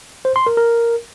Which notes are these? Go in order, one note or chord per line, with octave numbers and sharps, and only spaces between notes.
C5
C6
A#4
A#4